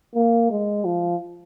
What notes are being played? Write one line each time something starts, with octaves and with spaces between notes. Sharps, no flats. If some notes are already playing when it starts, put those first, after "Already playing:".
A#3
G#3
F3